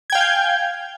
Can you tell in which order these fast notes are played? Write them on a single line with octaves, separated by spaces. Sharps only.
G#6 G5 F5 G#5 G6